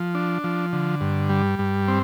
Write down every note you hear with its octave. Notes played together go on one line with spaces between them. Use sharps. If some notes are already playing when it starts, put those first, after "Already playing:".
Already playing: F3
D4
F3
D3
G2
G3
G2
C4